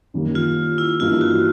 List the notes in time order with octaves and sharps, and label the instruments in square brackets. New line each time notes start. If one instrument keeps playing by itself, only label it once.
[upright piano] F#2 D#3 G3 A#3
[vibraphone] F4
E4
[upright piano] G2 E3 G3 A#3 D#4 [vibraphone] F4
[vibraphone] F#4